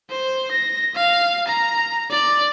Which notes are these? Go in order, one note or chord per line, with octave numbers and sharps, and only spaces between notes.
C5
A#6
F5
A#5
D5